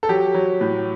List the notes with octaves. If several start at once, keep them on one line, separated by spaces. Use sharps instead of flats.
A4
F#3 G4
F#3
A2